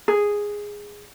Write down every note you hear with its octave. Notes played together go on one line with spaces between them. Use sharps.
G#4